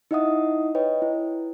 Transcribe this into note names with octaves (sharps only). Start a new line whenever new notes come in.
D#4 E4 D#5 E5 F#5 D#6
B4 C#5 D#5 G5
E4